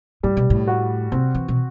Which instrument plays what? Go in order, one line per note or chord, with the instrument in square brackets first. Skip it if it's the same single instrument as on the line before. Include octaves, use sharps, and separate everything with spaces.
[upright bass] A2 [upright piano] G3
[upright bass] B2
A2
[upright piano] F#4
[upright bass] C3 [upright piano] C4
[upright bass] E3
B2